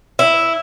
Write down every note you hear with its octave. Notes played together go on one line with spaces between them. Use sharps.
E4